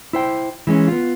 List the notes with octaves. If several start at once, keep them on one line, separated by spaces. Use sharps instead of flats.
E4 C5 G5
E3 G#3 B3 C#4
B3 F4